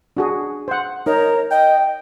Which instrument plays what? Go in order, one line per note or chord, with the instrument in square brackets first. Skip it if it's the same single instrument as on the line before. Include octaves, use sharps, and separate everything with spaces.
[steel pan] D4 F#4 G#4
C5 F#5
[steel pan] D#4 [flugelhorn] A#4 [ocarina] C#5
[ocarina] D#5 [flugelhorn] G5